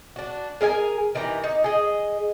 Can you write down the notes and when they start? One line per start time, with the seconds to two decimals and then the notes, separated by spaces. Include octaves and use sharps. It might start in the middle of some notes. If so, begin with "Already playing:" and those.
0.16 D4 F#4
0.61 G#4 A#4 D#5 G#5
1.15 D#3 E3 G4 A#5
1.44 D#4
1.64 G#4 D#5